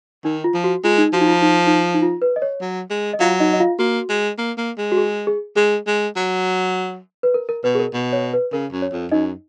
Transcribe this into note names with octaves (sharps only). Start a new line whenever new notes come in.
D#3 D#4
F4
F3
F#4
G#3 F4
D#4
F3 F#4
D#4
F4
D#4
D#4
D#4
F4
B4
D#5
C#5
F#3
G#3
D#5
F#3 F4 F5
D#4 D#5
D#5
F4 F5
A#3 F#4
G#3
A#3
A#3
G#3
F#4
G#4
G#4
G#3 G#4
G#3
F#3
B4
A#4
A#4
B2 B4
G#4
A#4
B2
C#5
B4
C#3 A#4
F#2
C#5
F2
F#2 D#4 D#5